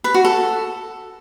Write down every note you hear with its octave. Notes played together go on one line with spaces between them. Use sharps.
B4
F#4
A4